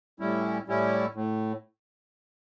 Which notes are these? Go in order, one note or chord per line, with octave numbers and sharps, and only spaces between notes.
A2 G3 C#4 E4
A2 G3 C#4 E4
A2